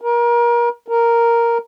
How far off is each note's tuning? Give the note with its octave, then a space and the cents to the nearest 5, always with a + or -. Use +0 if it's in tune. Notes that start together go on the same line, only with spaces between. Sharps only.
A#4 +30
A#4 +0